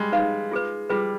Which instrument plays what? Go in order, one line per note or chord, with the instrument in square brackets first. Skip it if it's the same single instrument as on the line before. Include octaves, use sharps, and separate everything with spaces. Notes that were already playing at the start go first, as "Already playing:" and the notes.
Already playing: [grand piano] G3 G#3
[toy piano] D#4 B4 F5
[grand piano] G#3
[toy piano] F4 G#4 B4
[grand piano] G3 [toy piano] F4 G#4 B4